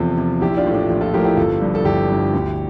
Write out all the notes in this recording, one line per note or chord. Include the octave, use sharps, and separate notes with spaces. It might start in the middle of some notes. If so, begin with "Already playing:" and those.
Already playing: E2 C3 F3 F4 A4
C3 F3
A#1 E4 G4
D4 F4
A2 F3
D4 F4
A#1
F4 A4
A2 F3 G4 A#4
E4 G4
G1 F4 A4
G2 F3
A4
G1 E4 G4
G2 F3
D2